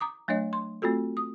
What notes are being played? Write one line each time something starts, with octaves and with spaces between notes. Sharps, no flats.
A#5 D6 D#6
F#3 A3 D4 C#5 D#5
C6
A3 C4 F4 F#4 A4
D#6